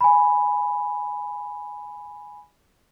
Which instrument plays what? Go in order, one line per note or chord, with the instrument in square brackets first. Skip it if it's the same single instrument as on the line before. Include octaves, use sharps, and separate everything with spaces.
[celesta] G#5 B5